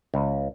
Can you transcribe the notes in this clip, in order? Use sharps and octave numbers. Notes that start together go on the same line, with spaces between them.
C#2